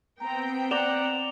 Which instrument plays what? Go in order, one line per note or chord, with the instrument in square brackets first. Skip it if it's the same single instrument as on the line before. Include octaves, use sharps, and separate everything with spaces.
[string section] B3 C4 G5 [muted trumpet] A#5
[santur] D5 A#5 [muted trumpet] F#5 [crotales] E7 F7 G7